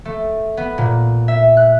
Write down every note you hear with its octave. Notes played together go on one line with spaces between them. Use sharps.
A3
B3
A#2
E5
F#6